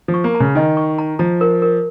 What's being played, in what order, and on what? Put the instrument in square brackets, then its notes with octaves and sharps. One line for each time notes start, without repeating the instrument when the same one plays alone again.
[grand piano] F3
[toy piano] C#6
[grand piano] A#3
[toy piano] A#5
[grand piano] C#3
[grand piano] D#3 [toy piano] D#5
[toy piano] C#6
A#5
[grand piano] F3 [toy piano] A#5
[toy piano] A#4
A#4